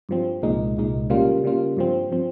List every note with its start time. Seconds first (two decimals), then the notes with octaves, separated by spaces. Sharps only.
0.09 G2 F3 C4
0.42 C2 A#2 G#3 D#4
0.77 C2 A#2 G#3 D#4
1.10 C#3 G3 A#3 F4
1.44 C#3 G3 A#3 F4
1.77 G2 F3 C4
2.12 F3 C4